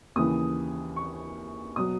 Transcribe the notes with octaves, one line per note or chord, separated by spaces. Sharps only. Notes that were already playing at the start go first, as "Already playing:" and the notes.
D#2 C#3 E3 D#6
C#6
B2 F#3 D#6